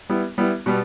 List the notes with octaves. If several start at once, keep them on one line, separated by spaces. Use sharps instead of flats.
G3 B3 E4
G3 B3 E4
B2 G3 B3